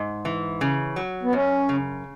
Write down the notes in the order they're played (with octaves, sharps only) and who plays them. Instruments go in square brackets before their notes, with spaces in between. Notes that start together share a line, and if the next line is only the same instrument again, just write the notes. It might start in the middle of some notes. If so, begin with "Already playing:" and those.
Already playing: [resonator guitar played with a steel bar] G#2
E3
C#3
F#3
[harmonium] B3
[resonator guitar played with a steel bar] F#2 [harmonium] C#4
[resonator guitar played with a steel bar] C#3